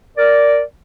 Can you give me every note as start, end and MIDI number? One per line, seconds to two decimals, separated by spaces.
0.17 0.61 70
0.17 0.61 74